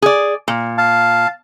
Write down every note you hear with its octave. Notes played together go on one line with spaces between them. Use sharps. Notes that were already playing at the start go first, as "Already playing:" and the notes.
G#4 D5
A#2
F5 A5